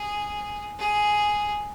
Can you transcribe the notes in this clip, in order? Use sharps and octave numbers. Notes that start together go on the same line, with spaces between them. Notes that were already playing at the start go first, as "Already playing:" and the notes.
Already playing: G#4
G#4